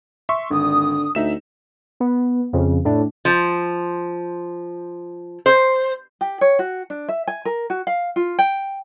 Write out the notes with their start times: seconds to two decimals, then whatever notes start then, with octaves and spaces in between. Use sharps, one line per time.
0.29 E5 C6 C#6
0.51 G#1 D3 D#6
1.15 D2 D#4 E5 E7
2.00 B3
2.53 F2 C#3
2.85 A2 D4
3.25 F3
5.46 C5
6.21 G4
6.41 C#5
6.59 F#4
6.90 D4
7.09 E5
7.27 G#5
7.45 A#4
7.70 F#4
7.87 F5
8.16 F4
8.39 G5